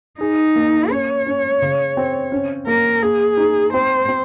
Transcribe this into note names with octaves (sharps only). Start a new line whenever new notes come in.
D#4 G#4
A#3
C#4 C#5
C#4
C#3
C4
C#4
A#3 A#4
A#3 G#4
D#4
C4 C5
C4